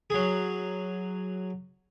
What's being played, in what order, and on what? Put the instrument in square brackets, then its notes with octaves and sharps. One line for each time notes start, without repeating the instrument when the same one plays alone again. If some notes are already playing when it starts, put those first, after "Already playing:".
[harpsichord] F#3 G#4